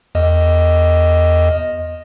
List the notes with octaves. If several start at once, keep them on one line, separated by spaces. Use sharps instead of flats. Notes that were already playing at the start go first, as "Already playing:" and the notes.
E2 D#5